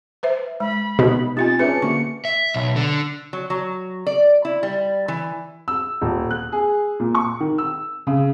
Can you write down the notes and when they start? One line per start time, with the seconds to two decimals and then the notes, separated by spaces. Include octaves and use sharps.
0.23 B4 C5 E5
0.60 G#3 B5
0.99 B2 B3 D#4
1.37 C4 D#4 F4 G4 A6
1.59 C#4 D4 G#4 B4 E5 C#7
1.82 D3 A#3 F#4 C#6
2.25 E5
2.54 B1
2.76 D3
3.33 F#3
3.50 F#3
4.07 D5
4.45 E4
4.63 G3
5.08 E3
5.68 E6
6.01 D#1
6.31 F#6
6.52 G#4
7.00 A#2
7.15 C#6
7.40 D#3
7.58 E6
8.07 C#3